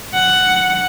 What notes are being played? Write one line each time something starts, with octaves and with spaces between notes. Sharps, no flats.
F#5